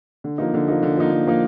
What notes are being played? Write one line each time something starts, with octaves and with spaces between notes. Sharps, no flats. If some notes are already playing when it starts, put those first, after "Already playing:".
D3
F3 A#3 D#4
D3
F3 A#3 D#4
D3
F3 A#3 D#4
D3
F3 A#3 D#4